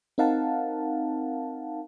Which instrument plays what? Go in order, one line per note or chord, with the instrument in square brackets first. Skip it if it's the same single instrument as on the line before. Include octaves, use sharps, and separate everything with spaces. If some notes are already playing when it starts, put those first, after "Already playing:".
[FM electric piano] C4 D#4 A#4 F5 F#5 A5